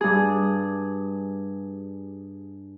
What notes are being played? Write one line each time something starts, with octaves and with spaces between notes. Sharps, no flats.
G2 G#4